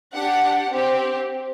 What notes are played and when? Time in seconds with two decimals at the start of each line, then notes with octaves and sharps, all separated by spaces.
0.14 D4 G4 F#5
0.70 C4 G4